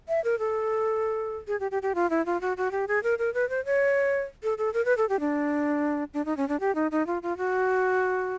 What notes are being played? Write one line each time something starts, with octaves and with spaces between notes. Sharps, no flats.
E5
A#4
A4
G#4
G4
G4
G4
F4
E4
F4
F#4
F#4
G4
G#4
A#4
A#4
B4
C5
C#5
A4
A4
A#4
B4
A4
G4
D4
D4
D#4
C#4
D4
G4
D#4
D#4
F4
F4
F#4